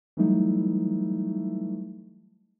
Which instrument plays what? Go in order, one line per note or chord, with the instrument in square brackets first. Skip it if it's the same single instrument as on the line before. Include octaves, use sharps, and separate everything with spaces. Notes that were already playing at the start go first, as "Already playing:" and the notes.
[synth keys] E3 F#3 G3 A3 D#4 E4